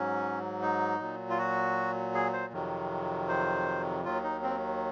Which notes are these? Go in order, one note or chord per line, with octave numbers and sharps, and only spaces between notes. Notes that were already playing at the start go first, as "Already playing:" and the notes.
Already playing: G#2 F#3 C#4
D#4
A#2 F#3
F4
F#4
G#4
C5
F2 C3 D#3 F#3
C5
D#2 D#3 F#3 F4
D#4
C4